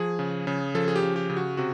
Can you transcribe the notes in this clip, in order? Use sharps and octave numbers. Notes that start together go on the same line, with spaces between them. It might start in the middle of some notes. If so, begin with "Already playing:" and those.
Already playing: F3 G#4
C#3
C#3
F3 A4
G#4
G4
C#3
G4
C#3
F#4
C3 F#4